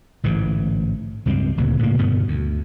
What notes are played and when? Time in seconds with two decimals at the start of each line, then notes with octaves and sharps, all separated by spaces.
0.24 A1 G#2 D3 E3
1.26 C#2 G2 G#3 C4
1.57 F1 D2 A#2 C#3
1.79 A2 C#3 A3 A#3
1.97 G2 B2 D3 B3
2.28 D2